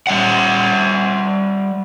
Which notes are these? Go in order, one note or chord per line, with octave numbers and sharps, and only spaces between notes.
G3 E5 F#5